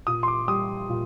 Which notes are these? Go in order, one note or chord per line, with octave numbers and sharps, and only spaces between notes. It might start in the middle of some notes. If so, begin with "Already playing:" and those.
A#2 D#6
C6
D6
G3 D#6
A#2